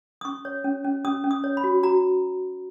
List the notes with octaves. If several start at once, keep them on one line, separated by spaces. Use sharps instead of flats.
D#6
C#4 C#6
C#5
C#4
C#4
C#4 D#6
C#4
D#6
C#5
B5
F#4
F#4 A#5